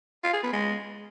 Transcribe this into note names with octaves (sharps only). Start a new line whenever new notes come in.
F4
G#4
B3
G#3